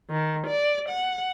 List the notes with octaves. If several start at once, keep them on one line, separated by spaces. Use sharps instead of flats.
D#3
D5
F#5